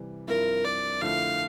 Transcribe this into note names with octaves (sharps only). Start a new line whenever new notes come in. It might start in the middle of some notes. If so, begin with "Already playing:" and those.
Already playing: C3 E3 G3
G2 F3 C4 E4 A#4
D5
F2 D3 A3 E4 F5